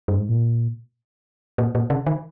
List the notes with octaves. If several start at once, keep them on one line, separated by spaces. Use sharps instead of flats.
G2
G#2
A#2
A#2
A#2
C#3
D#3